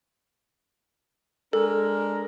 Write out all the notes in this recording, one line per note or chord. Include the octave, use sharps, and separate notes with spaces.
G#3 D4 A4 A#4